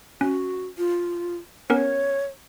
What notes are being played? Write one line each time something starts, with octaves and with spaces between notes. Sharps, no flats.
C#4 F#4
F4
B3 C#4 A#4 C#5